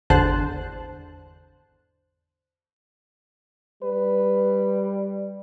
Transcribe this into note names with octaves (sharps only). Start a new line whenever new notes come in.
G#1 E2 D3 C5 A5 F#6
G3 B4